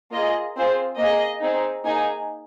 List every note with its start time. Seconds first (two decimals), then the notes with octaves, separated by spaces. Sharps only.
0.13 A#3 F4 G#4 D#5
0.56 C4 F4 G#4 C5
0.98 A#3 G#4 D#5
1.42 C4 D#4 G#4
1.84 A#3 D#4 G#4 G#5